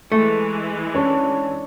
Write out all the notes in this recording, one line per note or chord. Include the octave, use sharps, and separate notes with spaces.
E3 G#3 A3
C#4 D4 C#5